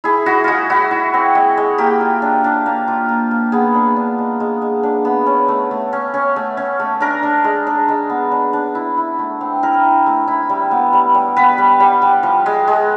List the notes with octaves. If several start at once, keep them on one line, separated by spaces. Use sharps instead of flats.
E4 G#4
E4 F#4
G#3 F4 F#4
E4 F#4
E4
C4
G#3
G#3
A#3 G4
F4
D4
D4
A#3
F4
A#3
A#3
B3 G#4
D4
D4
G#3
G#3
G#3
D4
B3
C#4
A3
A3
C#4
C#4
A3
C#4
A3
D4 A#4
D4
G#3
D4
G#3
B3
D4
D4
E4
E4
A3
C4
E4 A#4
E4
A3
E4
G3
B3
G3
G3
B3 B4
G3
G3
G3
F3
G#3
G#3